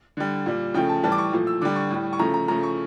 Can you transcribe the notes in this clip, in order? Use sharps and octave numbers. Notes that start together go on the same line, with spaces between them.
D3 G3
A#2 G3
C#3 F3 A3 G5
A5
A2 E3 G3 A5
D6
C#6
A#2 F3 A3
E6
D3 G3 D6
C#6
A2 G3
C#6
C#3 F3 A3 A#5
A#5
C#3 F3 A3 A#5
C#6